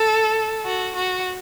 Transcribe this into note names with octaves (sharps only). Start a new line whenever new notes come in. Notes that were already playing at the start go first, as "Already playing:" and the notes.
Already playing: A4
F#4
F#4